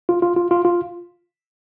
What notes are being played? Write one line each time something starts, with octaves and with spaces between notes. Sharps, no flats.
F4
F4
F4
F4
F4